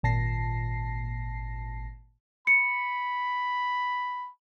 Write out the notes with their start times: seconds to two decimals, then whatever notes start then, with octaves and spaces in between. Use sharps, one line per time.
0.03 G#1 A#2 A5 A#6 C7
2.47 B5 C#7